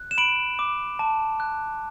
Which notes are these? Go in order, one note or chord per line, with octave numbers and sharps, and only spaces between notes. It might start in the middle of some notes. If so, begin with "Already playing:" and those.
Already playing: F#6
E7
B5 D7 F#7
D6
A5
F#6